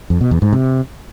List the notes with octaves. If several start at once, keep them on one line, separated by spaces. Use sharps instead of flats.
F2
B2
E2
G#2
C3